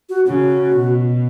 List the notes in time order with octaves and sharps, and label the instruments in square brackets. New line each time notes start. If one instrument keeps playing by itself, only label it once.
[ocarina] F#4
[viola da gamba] C#3 [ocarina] F#4
[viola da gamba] B2